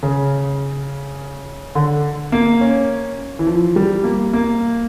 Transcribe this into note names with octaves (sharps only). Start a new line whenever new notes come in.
C#3
D3
A#3
C#4
E3
F3
G3
A#3
A#3